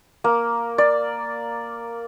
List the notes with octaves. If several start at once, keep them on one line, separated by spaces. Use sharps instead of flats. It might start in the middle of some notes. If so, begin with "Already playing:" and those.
A#3
D5